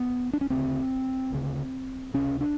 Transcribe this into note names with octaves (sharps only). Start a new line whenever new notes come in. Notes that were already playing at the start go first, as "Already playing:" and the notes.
Already playing: B3
D4
C#4
D2 C#3 C4
D2 C#3
C#2 C3 C#4
D4